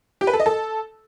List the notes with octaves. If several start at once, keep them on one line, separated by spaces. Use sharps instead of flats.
G4
B4
A4
D#5
A4